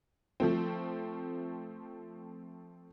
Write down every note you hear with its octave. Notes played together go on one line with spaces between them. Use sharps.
F3 A3 C4